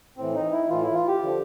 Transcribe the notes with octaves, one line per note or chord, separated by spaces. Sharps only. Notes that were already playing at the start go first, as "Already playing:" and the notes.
A2 E3 C4
D#4
E4
A2 E3 F4
E4
F4
G4
D3 F3